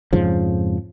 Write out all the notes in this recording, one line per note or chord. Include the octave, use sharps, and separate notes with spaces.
F2 G#2 C#3 F3